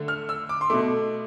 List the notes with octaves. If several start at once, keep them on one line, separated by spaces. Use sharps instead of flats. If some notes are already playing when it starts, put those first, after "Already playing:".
Already playing: D3 A3
F6
E6
D6
C6
B2 A3 D6